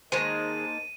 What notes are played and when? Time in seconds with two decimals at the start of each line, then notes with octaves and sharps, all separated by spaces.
0.12 D#3 G#3 A#3 D#4 C5 A5 D#7